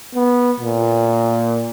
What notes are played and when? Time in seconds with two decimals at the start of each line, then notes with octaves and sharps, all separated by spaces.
0.15 B3
0.60 A#2